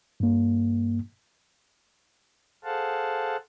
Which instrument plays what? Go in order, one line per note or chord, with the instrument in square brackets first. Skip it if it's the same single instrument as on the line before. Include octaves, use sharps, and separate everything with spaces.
[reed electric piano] G2 A#3
[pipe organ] G#4 A4 C5 F5 F#5 A5